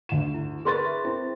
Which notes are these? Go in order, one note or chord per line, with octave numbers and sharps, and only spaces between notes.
D2 E7
E4
G#4 A#4 B4 C6 C#6 A6
E5
C4 E4